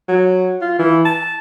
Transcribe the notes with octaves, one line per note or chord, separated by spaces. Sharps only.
F#3
F4
E3
A5